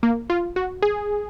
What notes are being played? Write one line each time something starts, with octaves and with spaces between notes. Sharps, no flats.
A#3
F4
F#4
G#4